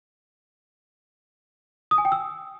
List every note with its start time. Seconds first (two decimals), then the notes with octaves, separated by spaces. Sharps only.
1.91 D#6
1.98 G#5
2.05 G5
2.12 E6